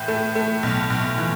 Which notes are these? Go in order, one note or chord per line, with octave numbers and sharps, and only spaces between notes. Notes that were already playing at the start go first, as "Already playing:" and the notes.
Already playing: A2 E3
A3
A3
B1
B1
E3